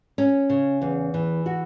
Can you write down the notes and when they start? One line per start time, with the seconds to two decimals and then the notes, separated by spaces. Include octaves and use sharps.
0.18 C#4
0.50 C#3
0.82 E2
1.14 E3
1.46 F#4